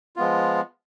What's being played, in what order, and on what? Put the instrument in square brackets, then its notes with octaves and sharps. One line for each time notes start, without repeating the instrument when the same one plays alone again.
[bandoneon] F3 G#3 B3 F4